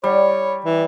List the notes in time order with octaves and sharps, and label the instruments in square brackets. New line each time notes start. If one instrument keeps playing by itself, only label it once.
[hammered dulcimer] G3 [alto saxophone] C#5
[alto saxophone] E3